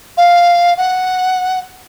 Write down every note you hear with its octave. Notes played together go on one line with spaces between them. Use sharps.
F5
F#5